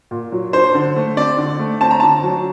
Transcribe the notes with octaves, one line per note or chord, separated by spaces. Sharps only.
A#2
F#3
D4 C5
D3
A3
C4 D5
D3
A3
C4 A5
A#5
D3 A5
F#3